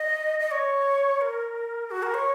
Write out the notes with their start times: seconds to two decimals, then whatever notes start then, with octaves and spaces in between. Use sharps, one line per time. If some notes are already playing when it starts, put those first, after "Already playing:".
Already playing: D#5
0.40 D#5
0.51 C#5
1.21 A#4
1.91 F#4
2.02 A#4
2.14 C#5